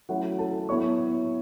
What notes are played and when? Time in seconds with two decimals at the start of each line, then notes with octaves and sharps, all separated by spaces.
0.09 F#3 A3 C#4 E4 F#4 F#5
0.39 A4 A5
0.69 F#3 B3 E4 C#5 C#6